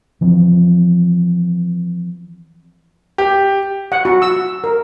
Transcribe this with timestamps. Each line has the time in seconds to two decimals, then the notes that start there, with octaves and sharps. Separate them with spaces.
0.21 E3 F3 C4
3.18 G4
3.92 F#5
4.05 F#4
4.22 E6
4.64 A#4